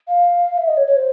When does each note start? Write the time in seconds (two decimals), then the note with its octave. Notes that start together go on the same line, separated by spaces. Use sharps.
0.08 F5
0.58 E5
0.68 D#5
0.77 C#5
0.87 C#5
0.96 C5